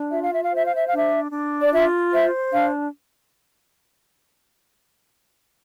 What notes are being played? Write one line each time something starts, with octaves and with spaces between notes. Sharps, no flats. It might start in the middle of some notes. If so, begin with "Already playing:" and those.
Already playing: D4
F4 E5
F5
E5
F5
C5 E5
F5
E5
D4 F5
E5
D4
D5
F4 E5
C5 E5
D4 F5